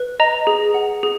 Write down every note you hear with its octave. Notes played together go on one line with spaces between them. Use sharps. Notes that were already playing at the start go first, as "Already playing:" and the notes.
Already playing: B4
D#5 A#5
G#4
F#5
G#4